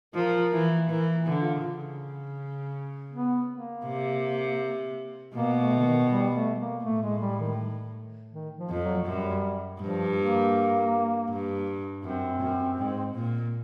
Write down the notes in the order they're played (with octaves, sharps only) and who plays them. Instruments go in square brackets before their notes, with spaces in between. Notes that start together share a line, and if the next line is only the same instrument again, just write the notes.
[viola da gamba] F3 [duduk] A#4
[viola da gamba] E3
[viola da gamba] E3 [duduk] A#4
[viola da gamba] D3
[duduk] F4
[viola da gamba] C#3
[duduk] B3
A#3
[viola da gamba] C3
[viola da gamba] B2 [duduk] A#3
[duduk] A3
D3
D#3
G3
A3
A#3
[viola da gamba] A2 [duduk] A3
[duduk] G#3
G3
D#3
D#3
F3
[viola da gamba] F2
[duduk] F#3
[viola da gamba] F#2 [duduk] G3
[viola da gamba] G2 [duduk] F3
[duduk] A#3
[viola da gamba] G2
[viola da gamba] F#2 [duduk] C4
[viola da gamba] F#2
G#2
A#2